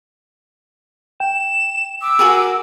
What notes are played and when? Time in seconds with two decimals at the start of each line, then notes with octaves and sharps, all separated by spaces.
1.20 G5 E7
2.02 D6 E6
2.19 F#4 G#4 A#4